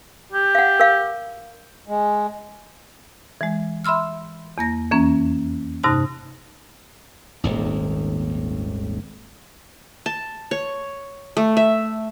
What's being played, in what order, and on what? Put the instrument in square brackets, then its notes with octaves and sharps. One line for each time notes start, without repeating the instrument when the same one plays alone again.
[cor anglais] G4
[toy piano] F5 F#5
A#4 F5
[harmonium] G#3
[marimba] E3 G#3
E5 B5 C6 E6 F6
E2 A#3 A#6
F2 E3 A#3 C#4
G2 C3 D#4 A5 F#6
[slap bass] D#1 G#1 D#2
[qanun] A5
C#5
A3
E5